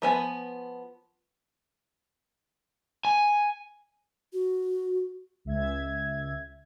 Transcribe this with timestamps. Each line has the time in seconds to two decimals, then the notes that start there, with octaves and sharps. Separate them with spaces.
0.02 F3 B3 G#5
3.05 G#5
4.33 F#4
5.45 C#2 E5 G#6